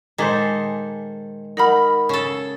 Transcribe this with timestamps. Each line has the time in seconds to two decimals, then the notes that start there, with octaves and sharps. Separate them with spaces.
0.18 A#2 D#3 G#3 G#4 A4 C5 G#5
1.57 D#4 A#4 F#5 B5 F6
2.09 C#3 A4 C#6